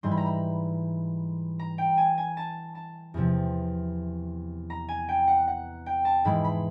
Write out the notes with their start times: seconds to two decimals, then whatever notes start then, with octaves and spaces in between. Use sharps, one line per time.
0.03 G#2 E3 G3 C6
0.11 B5
0.17 A#5
0.26 B5
1.59 A#5
1.78 G5
1.97 G#5
2.18 G#5
2.37 A5
2.75 A5
3.14 E2 C3 F3
4.70 A#5
4.89 G#5
5.09 G5
5.28 F#5
5.48 F#5
5.86 G5
6.05 A5
6.25 G#2 E3 G#3 B5
6.44 B5